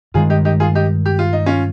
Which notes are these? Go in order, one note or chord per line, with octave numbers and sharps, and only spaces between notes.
G2 D#3 G#3 F4 G#4
D#4 G4
D#4 G4
F4 G#4
D#4 G4
G4
F4
D#4
C#4 F4